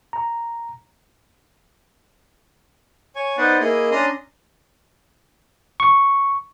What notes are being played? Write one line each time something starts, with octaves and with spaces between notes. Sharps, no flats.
A#5
C#5 G#5
B3 D#4 B4 C5 D5 F#5
A#3 E4 G#4 D#5
C#4 D4 A#5 C6 D#6
C#6